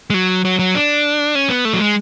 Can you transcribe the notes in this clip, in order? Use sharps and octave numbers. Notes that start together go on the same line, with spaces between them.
G#3
F#3
F#3
F#3
D4
C#4
B3
A3
F#3
G#3